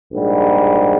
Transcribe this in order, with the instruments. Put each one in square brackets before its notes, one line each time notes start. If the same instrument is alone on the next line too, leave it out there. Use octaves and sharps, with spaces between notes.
[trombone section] A#1 G#2 G3